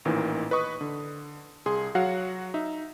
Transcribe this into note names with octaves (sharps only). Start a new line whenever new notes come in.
A1 A#2 D#3 E3
B4 D#5 C#6 D#6
D3
C2 G#4 C6
F#3 F#4 F5 F#5
D#4 E5